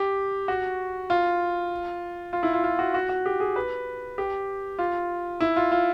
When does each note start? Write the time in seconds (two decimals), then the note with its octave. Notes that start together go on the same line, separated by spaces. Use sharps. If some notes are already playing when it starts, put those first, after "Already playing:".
Already playing: G4
0.48 F#4
1.10 F4
2.33 F4
2.43 E4
2.53 F4
2.64 F4
2.79 F#4
2.94 F#4
3.09 F#4
3.26 G4
3.40 G#4
3.56 B4
4.18 G4
4.79 F4
5.41 E4
5.56 F4
5.72 F4